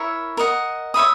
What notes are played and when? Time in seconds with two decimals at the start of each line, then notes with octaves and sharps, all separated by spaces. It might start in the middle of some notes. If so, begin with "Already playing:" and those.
Already playing: E4 A#4 C#5 E5
0.37 A#4 D#5 F#5
0.94 C#5 E5 B5 D#6